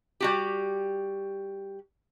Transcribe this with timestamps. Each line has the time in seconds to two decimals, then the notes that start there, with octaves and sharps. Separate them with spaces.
0.20 G3 F#4 G4